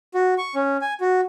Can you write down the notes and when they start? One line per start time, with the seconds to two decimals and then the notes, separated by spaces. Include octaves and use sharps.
0.14 F#4
0.38 C#6
0.55 C#4
0.81 G#5
1.01 F#4